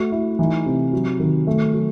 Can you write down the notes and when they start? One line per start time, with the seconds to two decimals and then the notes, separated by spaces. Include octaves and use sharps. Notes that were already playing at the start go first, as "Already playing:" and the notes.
Already playing: A3 F#4
0.12 A3 E4
0.39 E3 D#4
0.66 C3
0.93 F#3
1.20 D#3
1.47 A3
1.74 F#3